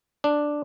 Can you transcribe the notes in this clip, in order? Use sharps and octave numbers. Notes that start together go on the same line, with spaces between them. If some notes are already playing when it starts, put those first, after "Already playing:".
D4